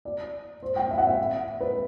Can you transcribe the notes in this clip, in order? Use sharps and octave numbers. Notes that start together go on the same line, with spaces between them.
D5
C5
G5
E5
F#5
E5
B4